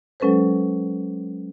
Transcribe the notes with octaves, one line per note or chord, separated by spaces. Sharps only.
F#3 G#3 C#4 A4 B4 C5